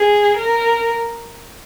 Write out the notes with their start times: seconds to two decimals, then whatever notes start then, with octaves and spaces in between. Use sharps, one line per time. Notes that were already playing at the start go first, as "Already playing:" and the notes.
Already playing: G#4
0.36 A#4